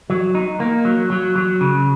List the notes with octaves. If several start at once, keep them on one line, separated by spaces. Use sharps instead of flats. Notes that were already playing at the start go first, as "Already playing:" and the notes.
F#3
D#4
A#3
F#3
F#3
F#3
C#3